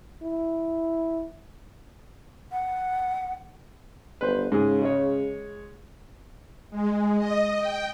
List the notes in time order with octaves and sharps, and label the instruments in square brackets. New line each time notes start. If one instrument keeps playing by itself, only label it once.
[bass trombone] E4
[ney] F#5
[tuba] G1 [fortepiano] B4 C5
[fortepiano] G#2 G#4 [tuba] C#3
[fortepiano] G#3 C#5
[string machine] G#3
D#5
G5